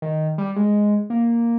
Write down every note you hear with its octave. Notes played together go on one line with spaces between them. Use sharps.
D#3
G3
G#3
A#3